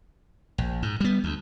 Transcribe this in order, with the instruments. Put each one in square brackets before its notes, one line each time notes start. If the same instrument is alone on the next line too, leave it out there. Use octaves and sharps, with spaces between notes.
[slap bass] A#1
G#2
G3 B3
D2